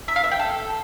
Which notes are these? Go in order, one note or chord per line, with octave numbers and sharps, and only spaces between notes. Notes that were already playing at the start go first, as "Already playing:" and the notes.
E5
F5
E5
G5
A4